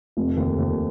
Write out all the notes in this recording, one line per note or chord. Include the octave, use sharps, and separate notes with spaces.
F1
D#2
D#2